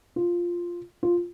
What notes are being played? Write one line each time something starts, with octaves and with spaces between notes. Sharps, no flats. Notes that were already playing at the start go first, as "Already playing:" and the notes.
F4
F4